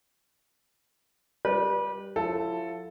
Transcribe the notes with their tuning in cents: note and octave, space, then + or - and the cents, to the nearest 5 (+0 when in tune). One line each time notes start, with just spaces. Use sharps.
G3 +0 B4 -30 D5 +5
F3 +45 E4 +35 A4 +0